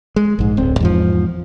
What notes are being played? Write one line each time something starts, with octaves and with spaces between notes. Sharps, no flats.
G#3
A#1 G#2
D1 C4
E2 G#2 F3